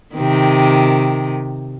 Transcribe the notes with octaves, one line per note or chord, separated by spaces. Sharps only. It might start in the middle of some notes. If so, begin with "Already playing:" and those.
C3 D#3